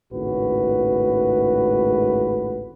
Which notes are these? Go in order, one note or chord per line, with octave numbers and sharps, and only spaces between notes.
G#1 C#2 A2 F#4 B4